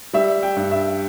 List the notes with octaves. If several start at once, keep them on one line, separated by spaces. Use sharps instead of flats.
G3 E5
G5
G2
E5